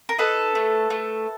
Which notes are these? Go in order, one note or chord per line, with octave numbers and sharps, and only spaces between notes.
A#4
D#4 A4 B4
A3
A3